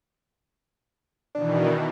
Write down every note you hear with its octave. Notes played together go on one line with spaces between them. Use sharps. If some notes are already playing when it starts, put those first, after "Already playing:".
B2 D#3 E3 D4